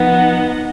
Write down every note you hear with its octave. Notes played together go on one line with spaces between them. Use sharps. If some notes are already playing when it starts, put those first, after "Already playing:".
Already playing: F3 B3 D#4 F#5